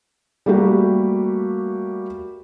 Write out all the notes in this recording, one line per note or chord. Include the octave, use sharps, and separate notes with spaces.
G3 A3 A#3 F#4 G4